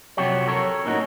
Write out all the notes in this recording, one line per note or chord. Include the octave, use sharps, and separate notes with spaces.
F2 C3 F#3 F#4 G4 C#5
A4 A#4 C#5
A2 A#3 C#4 D#4 F#4